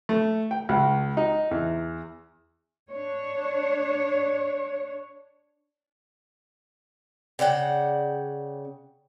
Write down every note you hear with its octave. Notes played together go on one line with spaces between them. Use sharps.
A3
G5
C#2
D#4
E2
D4 C#5
C#3 D5 F#5 G5